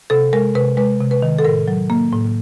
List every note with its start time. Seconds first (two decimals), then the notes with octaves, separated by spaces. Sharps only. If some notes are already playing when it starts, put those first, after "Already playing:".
0.10 C3 A4
0.33 G#3 A#4
0.55 C3 B4
0.77 G#3 B4
1.01 C3
1.11 B4
1.22 D#3
1.39 A4
1.45 A2 A#4
1.68 F#3
1.90 A#3
2.13 A2